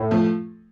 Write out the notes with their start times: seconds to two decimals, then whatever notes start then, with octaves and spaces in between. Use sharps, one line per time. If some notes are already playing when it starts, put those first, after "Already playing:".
Already playing: A2
0.11 F3 A3